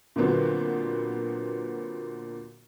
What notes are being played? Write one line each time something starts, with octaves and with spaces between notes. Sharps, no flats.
A#2 D3 F#3 B3 C4 F#4